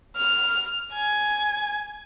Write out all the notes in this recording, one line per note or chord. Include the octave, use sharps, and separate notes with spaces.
F6
G#5